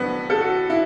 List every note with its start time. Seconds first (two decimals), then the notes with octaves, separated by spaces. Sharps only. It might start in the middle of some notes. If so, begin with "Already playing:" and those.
Already playing: A2 F#3 B3 D4
0.30 A4
0.38 F#4
0.70 E4